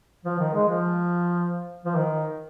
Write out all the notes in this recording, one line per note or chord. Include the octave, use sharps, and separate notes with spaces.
F3
D#3
G#3
F3
F3
D#3